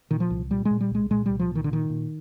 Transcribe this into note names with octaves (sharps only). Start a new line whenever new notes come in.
A#2 D#3
F3
C2
A#2 G3
G#3
A#2
G3
C2 G#3
A#2 G#3
C2 G3
F3
A#2
D#3
D3
A#2 D#3
A#2